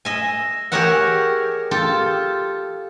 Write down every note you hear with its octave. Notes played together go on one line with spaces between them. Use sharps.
D#5 E5 G#5
G4 G#4 A#4 C#5 E5 F#5
F4 G4 A4